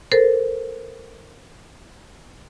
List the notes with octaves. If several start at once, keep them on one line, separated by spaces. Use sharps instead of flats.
A4 A#4 C5